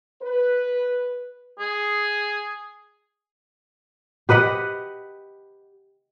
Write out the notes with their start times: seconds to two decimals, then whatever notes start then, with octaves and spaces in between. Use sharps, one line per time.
0.22 B4
1.60 G#4
4.29 G4 B4 D#5 F#5